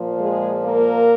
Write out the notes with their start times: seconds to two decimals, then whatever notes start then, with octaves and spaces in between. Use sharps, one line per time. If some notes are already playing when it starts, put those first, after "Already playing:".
Already playing: A#2 F3
0.20 G#3 G#4
0.64 A#3 A#4